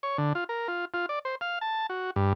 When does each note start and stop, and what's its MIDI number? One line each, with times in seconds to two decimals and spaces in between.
0.03 0.18 73
0.18 0.33 50
0.35 0.44 65
0.49 0.68 70
0.68 0.85 65
0.94 1.06 65
1.09 1.19 74
1.25 1.35 72
1.41 1.59 77
1.61 1.87 81
1.90 2.11 66
2.16 2.33 43